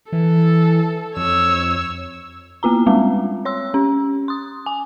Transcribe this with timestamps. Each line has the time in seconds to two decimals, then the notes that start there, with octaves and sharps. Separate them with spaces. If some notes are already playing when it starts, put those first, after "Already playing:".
0.12 E3 A4
1.17 F2 C#5 E6
2.63 A#3 B3 F4 A#5
2.86 G3 G#3 C4 F4
3.45 C#5 C6 E6
3.74 C#4
4.28 C6 D#6
4.66 G#5